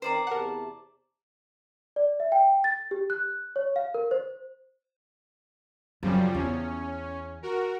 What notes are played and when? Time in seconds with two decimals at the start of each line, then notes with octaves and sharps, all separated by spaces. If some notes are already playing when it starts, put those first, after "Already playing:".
0.02 D#3 C4 A#4 C5 D5 A#5
0.27 E2 C3 A#4 F#5 A5
1.96 D5
2.20 E5
2.32 G5
2.64 A6
2.91 G4
3.10 F#6
3.56 C#5
3.76 F5
3.94 A#4
4.11 C5
6.03 F#2 C#3 F3 G3
6.34 E2 C#4
7.43 F#4 A#4